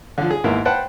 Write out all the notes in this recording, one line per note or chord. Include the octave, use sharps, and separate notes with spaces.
D3 F3
G#4
D#2 G#2 B3 E4 A#4
B4 C5 F#5 G5 A5